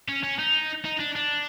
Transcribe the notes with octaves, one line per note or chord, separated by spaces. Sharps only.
C#4
C#4
D#4
D#4
D4
D4